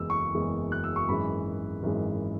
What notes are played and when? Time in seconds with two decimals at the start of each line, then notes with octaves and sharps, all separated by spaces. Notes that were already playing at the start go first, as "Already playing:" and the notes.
Already playing: F#1 E2 E3 G#3 E6
0.10 C#6
0.34 F#1 E2 E3 G#3
0.72 F#6
0.84 E6
0.96 C#6
1.09 G#1 F#2 E3 G#3 B5
1.83 G#1 F#2 E3 G#3